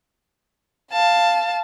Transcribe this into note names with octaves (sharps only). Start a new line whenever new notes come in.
F5 A5